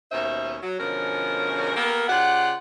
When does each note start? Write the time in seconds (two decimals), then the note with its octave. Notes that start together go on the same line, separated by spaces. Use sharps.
0.12 D#2 B2 C#4 D#4 C5 E5
0.62 F#3
0.79 B2 D3 F3 G#3 C#4 A#4
1.76 A#3 B3 G4 A4 A#4
2.08 C#3 F4 G4 D5 F#5